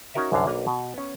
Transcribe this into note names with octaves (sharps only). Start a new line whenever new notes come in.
C#4 D#4 F#4 A#4 D#5 E5
C2 F#2 D3 F5
B1 A#3 D4 B4 C#5 A#5
B2
B3 C#4